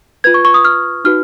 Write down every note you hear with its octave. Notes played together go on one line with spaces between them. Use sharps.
F4 B4 G#6
C#6
C#6
D#6
F6
D#4 F#4 B4 F6